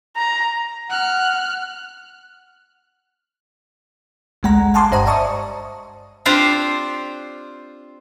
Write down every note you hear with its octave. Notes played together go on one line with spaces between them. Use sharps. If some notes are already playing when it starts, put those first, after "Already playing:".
A#5
F#5 F6 F#6
A1 D2 G#3 F#5 A#5
F5 F#5 G#5 A5 C6 D6
G1 G2 C5 D#5 A#5
D5 E5 A5 C#6 D#6
C4 D4 F4 G4 C5